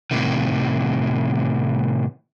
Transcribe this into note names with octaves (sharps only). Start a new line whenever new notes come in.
A2 C3 D#3